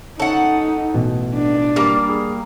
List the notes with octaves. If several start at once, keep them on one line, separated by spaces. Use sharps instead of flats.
C#4 D#4 A4 F#5
A1 B2
D4
G3 A#3
G#4